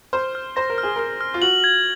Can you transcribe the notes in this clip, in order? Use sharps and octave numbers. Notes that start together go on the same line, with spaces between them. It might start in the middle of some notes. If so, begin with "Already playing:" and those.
C5 F6
F6
C5 A#6
A#4
F6
G#4
A#4 F6
F6
F4
F#4 F#7
G#6